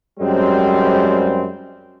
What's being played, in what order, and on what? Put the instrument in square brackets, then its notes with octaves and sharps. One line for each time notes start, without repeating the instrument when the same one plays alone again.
[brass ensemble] F#2 G3 G#3 C4